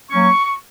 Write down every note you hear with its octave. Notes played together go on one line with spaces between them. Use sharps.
F#3 A#3 C#4 C#6